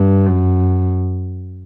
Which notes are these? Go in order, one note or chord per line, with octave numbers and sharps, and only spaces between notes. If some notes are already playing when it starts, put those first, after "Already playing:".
Already playing: G2
F#2